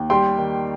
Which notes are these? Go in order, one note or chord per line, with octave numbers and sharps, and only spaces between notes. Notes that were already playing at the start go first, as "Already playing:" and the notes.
Already playing: D#2
G3 G5 C6
D#3